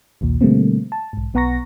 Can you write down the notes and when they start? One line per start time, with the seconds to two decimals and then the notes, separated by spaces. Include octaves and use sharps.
0.21 A#1 D#2 A#2
0.41 B2 D3 G3 A3 A#3 C4
0.92 A5
1.13 B1 G#2
1.34 B1 B3 F#5 A#5 C#6 A#6